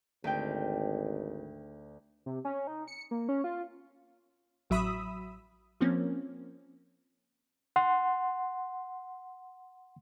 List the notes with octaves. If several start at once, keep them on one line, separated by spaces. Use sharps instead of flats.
G#1 D2 G5
C3
C#4
D#4
C#7
A#3
C#4
F4
A1 F#3 E5 B5 D#6 E6
F3 A#3 C4 C#4
F#5 C6